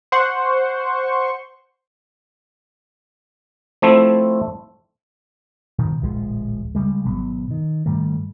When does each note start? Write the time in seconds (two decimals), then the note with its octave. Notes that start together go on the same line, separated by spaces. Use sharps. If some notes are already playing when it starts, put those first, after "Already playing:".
0.12 C5 F#5 C6 C#6
3.82 F3 A3 C4 E4
5.79 B2 D#3 F3
6.02 D1 A#1 F3 G#3
6.75 C#3 E3 G3 G#3
7.05 G#1 B2 F#3 B3
7.51 D#3
7.86 G#2 D#3 G3 A3